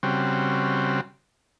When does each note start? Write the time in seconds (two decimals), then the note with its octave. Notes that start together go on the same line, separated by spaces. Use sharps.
0.03 C#3 G3 C4 F#4